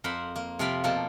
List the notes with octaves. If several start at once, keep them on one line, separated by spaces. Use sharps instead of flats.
F2 A#4 C5 F5 F#5 B5
A#3
C3 F3 A#4 D5 F5 B5
B2 F3 A#3 A4 D5 A5